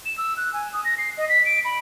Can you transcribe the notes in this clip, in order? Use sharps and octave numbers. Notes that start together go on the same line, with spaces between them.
E7
E6
F#6
G#5
D#6
A#6
C7
D#5
B6
D7
B5